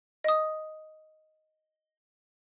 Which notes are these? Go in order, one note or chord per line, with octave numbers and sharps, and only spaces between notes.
D#5 D#6